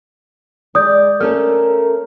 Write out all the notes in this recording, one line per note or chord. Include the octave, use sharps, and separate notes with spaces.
G#3 D5 D#6 G6
A3 C#4 A4 A#4 F6